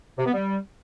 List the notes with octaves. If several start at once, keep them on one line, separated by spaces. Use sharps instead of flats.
C3
B3
G3